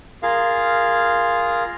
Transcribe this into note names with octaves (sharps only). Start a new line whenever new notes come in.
F4 G#4 A#4 F5